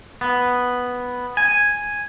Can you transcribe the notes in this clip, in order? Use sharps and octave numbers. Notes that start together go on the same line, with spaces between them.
B3
G#5